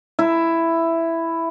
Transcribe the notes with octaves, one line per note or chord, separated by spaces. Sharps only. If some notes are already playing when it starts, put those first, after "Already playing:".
E4